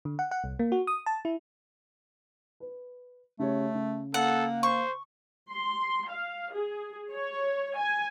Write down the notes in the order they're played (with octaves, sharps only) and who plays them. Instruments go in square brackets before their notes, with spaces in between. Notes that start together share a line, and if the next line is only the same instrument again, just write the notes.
[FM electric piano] D3
F#5
F#5
C2
A#3
F#4
D#6
A5
E4
[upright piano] B4
[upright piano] C#3 G4 C#5 [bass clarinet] A3
[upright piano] C#3
[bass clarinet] A#3 [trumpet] A4 [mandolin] F#5
[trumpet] C5 [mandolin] C#6
[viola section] C6
F5
G#4
C#5
G#5